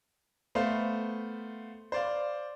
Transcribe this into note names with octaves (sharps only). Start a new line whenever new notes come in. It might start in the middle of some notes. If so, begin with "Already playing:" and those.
A3 B3 C5 F5
C5 D5 F5